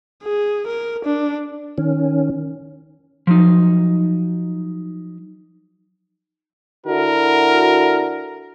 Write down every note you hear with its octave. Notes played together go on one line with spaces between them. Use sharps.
G#4
A#4
D4
D#3 C#4
F3 F#3 D#4
D3 E4 F#4 A#4